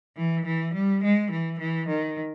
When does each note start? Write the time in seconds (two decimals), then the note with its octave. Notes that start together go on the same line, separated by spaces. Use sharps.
0.17 E3
0.46 E3
0.74 G3
1.04 G#3
1.31 E3
1.60 E3
1.89 D#3